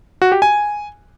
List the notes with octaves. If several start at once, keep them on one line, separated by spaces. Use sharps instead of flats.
F#4
G4
G#5